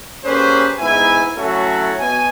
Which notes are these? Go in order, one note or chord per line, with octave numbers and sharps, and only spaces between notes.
A#3 C#4 G4 G#4 B4 C5
G#2 B3 E4 E5 G#5
F#3 A3 C#4 E4 F#4 A4
B2 G#5